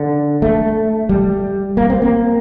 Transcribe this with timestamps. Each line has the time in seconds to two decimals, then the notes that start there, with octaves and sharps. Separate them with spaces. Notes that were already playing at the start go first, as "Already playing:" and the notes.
Already playing: D3
0.42 A3
1.09 G3
1.77 A#3
1.90 C4
2.02 A#3